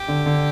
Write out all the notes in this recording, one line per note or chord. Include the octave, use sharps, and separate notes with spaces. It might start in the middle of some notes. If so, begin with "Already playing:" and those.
Already playing: G4
D3
D3